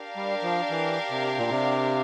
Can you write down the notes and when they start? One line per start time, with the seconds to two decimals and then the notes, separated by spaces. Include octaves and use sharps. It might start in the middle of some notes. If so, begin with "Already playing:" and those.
Already playing: D4 G4 A#4 D5 F5
0.16 G3
0.42 F3
0.70 E3
1.10 C3
1.38 A#2
1.50 C3